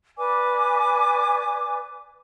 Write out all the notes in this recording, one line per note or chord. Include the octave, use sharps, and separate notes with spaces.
B4 D5 G#5 D6